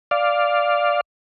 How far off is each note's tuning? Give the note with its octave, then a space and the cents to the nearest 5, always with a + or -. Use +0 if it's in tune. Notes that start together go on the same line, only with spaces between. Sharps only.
D5 +0 F5 +0